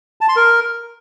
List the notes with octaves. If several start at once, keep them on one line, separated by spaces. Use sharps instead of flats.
A5
C6
A#4